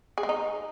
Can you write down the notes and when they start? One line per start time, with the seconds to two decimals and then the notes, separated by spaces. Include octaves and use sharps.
0.18 G#4
0.23 G#3
0.29 D#4